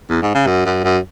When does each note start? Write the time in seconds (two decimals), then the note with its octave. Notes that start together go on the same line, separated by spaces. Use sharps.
0.10 E2
0.22 G#2
0.34 C#3
0.47 F#2
0.65 F#2
0.84 F#2